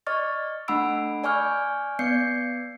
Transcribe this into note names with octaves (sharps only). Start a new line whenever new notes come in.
D5 D#5 C#6 F6 A6
A3 D4 F#5 B5 E6 D7
D5 G#5 C#6 F6 G6
B3 D5 G6 C7 C#7